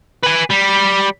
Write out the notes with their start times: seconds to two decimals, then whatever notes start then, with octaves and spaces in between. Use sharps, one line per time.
0.24 B4 G#5
0.51 G3